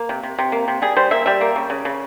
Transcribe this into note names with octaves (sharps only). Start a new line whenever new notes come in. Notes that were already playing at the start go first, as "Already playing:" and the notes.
Already playing: A#3
C3
C3
C3
A#3
C3
G3 G#4
G3 C5
A#3 E5
G3 E5
A#3
C#3
C#3
C#3